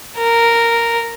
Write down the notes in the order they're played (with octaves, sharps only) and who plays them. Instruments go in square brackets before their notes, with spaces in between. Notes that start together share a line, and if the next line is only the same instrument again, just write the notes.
[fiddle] A#4